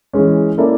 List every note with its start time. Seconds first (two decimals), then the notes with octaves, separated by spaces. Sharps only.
0.13 E3 G#3 C#4
0.58 A#3 C#4 E4 A4 D5